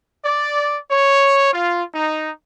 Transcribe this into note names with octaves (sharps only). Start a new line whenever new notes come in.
D5
C#5
F4
D#4